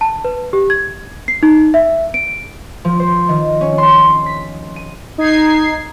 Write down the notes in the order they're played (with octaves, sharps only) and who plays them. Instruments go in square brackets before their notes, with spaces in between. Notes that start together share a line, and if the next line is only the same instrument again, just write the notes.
[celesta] A5
B4
G4
G#6
C7
D#4
E5
D7
[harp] F3
C5
D#3
C#4
C6
B6
D#7
[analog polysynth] D#4 G#6 C7